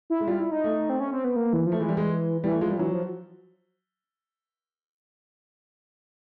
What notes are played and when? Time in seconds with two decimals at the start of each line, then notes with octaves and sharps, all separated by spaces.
0.10 E4
0.20 G#3
0.27 G3 F4
0.40 E4
0.51 D#4
0.64 A3
0.90 C4
1.00 C#4
1.12 C4
1.24 B3
1.36 A#3
1.53 E3
1.66 F3
1.72 A3
1.80 E3 G#3
1.89 G3
1.97 G#3
2.44 E3 G3
2.52 A3
2.61 F3 G#3
2.70 G3
2.79 E3 F#3
2.92 F3